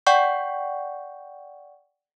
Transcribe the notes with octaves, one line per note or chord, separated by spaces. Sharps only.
D5 F#5 G5 C#6 G6